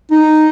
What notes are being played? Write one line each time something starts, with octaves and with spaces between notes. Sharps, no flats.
D#4